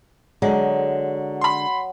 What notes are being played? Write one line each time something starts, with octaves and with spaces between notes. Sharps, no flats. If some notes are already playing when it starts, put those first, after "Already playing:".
D3 F#3 G#3
B5 C6